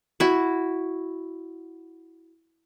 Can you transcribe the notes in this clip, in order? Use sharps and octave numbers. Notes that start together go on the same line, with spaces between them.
E4 F#4